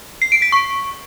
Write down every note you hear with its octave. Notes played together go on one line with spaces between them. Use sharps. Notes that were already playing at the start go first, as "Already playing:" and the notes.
C7
D7
B6
C#6